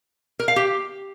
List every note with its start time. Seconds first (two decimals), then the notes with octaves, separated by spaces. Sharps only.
0.39 A#4
0.48 F5
0.56 G4